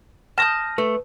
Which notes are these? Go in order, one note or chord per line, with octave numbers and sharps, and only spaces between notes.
A5 D#6 F6 G6 A#6
A3 B4